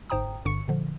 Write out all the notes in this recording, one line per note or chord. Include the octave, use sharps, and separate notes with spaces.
G1 G#2 C5 G5 A#5 D#6
G1 G2 D3 C#6 C#7
A#2 D3 F3